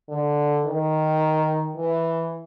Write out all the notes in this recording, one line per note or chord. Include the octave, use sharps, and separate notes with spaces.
D3
D#3
E3